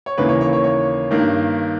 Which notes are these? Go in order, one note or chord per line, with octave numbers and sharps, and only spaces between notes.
C#5
D#2 C#3 E3 A#3 B4
C#5
C#5
C#5
C#5
G2 D#3 A#3